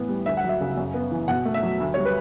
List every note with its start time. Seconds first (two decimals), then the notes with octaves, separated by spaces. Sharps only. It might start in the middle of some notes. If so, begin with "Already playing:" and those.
Already playing: A2 E3 B3
0.09 G3
0.26 D2 E5
0.37 F#5
0.44 F#3
0.49 E5
0.60 C#3
0.77 F#2
0.94 B3
1.11 E3
1.28 B2 F#5
1.45 A3
1.54 E5
1.63 F#3
1.80 D2
1.94 G3 C#5
2.05 B4